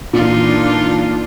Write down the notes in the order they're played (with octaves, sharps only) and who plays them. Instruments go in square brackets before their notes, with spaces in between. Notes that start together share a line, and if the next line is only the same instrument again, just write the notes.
[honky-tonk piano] A#2 [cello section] E3 D4 [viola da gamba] D#4 F4